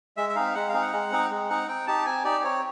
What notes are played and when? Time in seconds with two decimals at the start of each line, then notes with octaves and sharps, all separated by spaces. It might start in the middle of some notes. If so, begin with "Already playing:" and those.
0.17 G#3 E5
0.29 E5
0.36 C4 D#4 F5
0.55 G#3 F#5
0.69 F5
0.74 C4 D#4
0.82 F#5
0.93 G#3
1.12 C4 D#4
1.31 G#3
1.49 C4 D#4 F#5
1.68 C4 G5
1.87 D#4 G4 A5
2.06 C4 G#5
2.25 D#4 G4 D5
2.44 C4 C#5